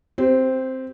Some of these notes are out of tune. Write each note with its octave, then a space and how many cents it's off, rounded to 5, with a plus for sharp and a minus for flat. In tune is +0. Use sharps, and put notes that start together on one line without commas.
C4 +0 G4 -5 C5 -25